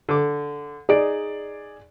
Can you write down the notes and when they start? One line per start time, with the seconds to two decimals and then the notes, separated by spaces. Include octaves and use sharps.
0.09 D3 D6
0.89 D#4 G#4 D5 D7